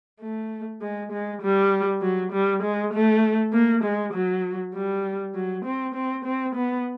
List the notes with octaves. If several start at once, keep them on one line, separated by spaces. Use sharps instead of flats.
A3
G#3
G#3
G3
F#3
G3
G#3
A3
A#3
G#3
F#3
G3
F#3
C4
C4
C4
B3